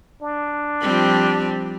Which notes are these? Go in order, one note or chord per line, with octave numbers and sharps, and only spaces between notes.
D4
F3 G3 C4